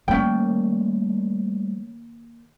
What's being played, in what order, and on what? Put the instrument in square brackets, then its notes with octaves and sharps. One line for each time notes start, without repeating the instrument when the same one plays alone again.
[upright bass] D#3 A#3 [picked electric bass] F3 G3 A3 [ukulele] C#4 G5